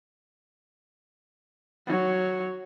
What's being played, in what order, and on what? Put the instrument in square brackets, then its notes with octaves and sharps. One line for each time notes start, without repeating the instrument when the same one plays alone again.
[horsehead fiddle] F#3 C#5